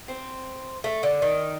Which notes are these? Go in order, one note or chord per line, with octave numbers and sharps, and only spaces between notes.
C4
A3
D3
D#3